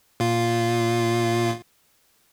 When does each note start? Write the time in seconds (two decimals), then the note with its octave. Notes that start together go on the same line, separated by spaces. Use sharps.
0.20 A#2 F4